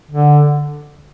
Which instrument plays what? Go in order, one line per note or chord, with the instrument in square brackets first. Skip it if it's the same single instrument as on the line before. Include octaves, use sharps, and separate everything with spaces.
[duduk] D3